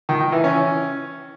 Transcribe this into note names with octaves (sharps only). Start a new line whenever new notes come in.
D#3
D#3
E3
C#4